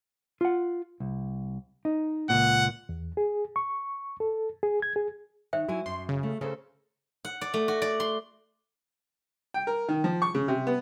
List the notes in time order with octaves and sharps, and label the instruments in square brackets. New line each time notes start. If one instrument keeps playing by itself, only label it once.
[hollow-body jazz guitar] F4 F#5
C2
D#4
[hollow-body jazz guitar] C#2 G2 A#2 [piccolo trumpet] F#5
[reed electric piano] E2
G#4
C#6
A4
G#4
G#6
G#4
[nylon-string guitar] D#3 [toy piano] C5 E5 G5
[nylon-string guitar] F#3 E4 G#5 [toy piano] F#4
[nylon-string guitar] F#2 [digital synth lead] C6
[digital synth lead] C#3
[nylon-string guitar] A3
[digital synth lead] C#3 [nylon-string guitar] A4 A#4 C5
[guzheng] F#5
D5
A3
F#4
D5
C6
[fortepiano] G5
A#4
D#3
F3
C#6
C#3
C3
B3